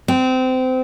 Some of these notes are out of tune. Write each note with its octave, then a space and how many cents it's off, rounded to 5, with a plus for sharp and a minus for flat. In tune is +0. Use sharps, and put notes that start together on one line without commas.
C4 -25